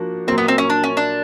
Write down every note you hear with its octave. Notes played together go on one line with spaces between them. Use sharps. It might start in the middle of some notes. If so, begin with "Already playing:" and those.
Already playing: F3 A#3 D4 F#4
A#2 F#3 A#3 C4
B3
C4
C#4
D4
C#4
D4